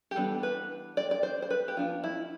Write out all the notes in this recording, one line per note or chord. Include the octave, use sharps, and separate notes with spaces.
G4
E3 G3 B3 D4 A4
B4
D5
D5
C5
C5
B4
G4
F3 B3 D4 F4
E4